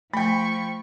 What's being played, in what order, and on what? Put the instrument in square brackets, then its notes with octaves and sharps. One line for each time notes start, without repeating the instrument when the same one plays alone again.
[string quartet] F3 C#6 [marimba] A3 [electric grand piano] G5 B5